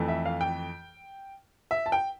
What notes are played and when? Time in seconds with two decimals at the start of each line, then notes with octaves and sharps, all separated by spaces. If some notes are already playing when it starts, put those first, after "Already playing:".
Already playing: F2 E3 A3
0.08 E5
0.26 F5
0.41 G5
1.71 E5
1.86 A5
1.92 G5